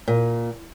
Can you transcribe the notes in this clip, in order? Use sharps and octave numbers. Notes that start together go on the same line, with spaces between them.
A#2